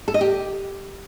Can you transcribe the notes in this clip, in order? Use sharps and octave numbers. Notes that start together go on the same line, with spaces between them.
A4
D#5
G4